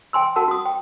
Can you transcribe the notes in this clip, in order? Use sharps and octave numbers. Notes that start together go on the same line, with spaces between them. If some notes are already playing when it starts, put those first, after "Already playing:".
G5 G#5 C6 E6
F#4 A#4 F#5 A5 E6
F#4 D#6
G5